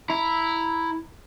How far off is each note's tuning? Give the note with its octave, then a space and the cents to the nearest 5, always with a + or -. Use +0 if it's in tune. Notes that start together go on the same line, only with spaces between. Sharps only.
E4 +0 A#5 +0